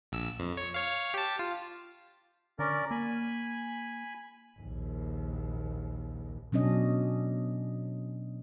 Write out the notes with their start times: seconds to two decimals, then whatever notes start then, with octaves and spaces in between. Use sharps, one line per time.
0.12 A#1 E6
0.39 F2
0.57 C#5
0.74 C#5 F5
1.14 G4 A5
1.39 F4
2.59 D3 C#4 A#4 D5
2.91 A#3 G#5 B5
4.60 A#1 D#2
6.52 B2 F#3 C#4 D4 D#5